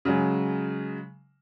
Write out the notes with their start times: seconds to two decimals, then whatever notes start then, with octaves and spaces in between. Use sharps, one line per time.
0.05 C#3 F#3 G#3